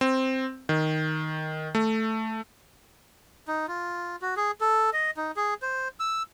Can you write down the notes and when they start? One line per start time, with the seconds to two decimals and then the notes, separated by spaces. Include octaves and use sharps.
0.01 C4
0.69 D#3
1.75 A3
3.48 D#4
3.68 F4
4.22 F#4
4.37 G#4
4.61 A4
4.93 D#5
5.17 D#4
5.36 G#4
5.62 C5
6.00 E6